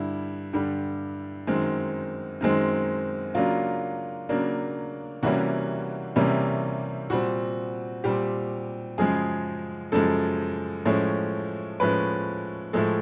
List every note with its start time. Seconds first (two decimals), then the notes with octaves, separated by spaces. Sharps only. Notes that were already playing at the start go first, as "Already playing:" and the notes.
Already playing: G2 D3 G3 E4
0.53 G2 D3 G3
1.47 F#2 D#3 G#3 C4
2.41 F#2 D#3 G#3 C4
3.35 C#3 F#3 A#3 D4 F4
4.29 C#3 F#3 A#3 D4
5.23 C3 E3 G3 A#3 C#4 F#4
6.16 C3 E3 G3 A#3 C#4
7.10 A#2 G3 C4 F#4
8.04 A#2 G3 C4 G4
8.98 F#2 C#3 F3 G#3 G#4
9.92 F#2 C#3 F3 G#3 A4
10.86 A2 F3 G#3 C#4
11.80 A2 F3 G#3 C#4 B4
12.73 A2 F3 G#3 A4